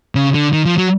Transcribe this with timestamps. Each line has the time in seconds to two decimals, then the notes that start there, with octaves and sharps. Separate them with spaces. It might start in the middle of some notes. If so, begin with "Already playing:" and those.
0.15 C#3
0.34 D3
0.53 D#3
0.65 F3
0.78 F#3